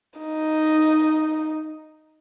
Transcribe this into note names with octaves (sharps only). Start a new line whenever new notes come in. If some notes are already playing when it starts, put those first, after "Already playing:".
D#4